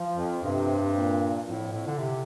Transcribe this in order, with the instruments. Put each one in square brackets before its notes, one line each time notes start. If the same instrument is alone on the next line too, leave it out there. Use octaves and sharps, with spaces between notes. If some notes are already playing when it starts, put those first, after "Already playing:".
Already playing: [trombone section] F3
[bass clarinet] F2
[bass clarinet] G2 [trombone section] C3
[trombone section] A#2
[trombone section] F2 [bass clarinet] A2
[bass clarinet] A2
D3
C3